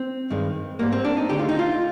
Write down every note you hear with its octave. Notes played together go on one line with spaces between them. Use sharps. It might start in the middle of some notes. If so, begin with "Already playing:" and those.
Already playing: C4
G2 D#3 G#3
G#2 G3 A#3
C4
D4
D#4
D2 D3 G#3 G4
F4
D#4
F4